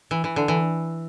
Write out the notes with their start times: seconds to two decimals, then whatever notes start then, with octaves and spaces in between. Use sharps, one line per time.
0.11 E3
0.24 E3
0.36 D3
0.48 E3